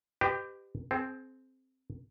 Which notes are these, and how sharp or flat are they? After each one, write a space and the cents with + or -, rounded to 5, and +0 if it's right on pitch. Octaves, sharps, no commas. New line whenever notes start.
G4 +0 B4 +40 D#5 -35
C4 +0 G#4 +35